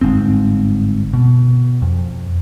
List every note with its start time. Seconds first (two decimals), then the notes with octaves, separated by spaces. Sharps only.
0.01 G1 G#2 C4
1.13 B2
1.82 F2